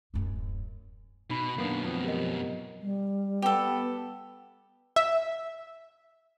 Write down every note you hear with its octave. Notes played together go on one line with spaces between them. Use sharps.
D1 F#2
B2 D#4 B5
F#2 B2 A#3 B3 D4
F3 B3 C4
G4 A#4 D#5
G3
B3 G4 A4
E5